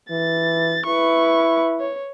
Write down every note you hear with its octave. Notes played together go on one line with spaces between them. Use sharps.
E3 A6
E4 B4 C#6
C#5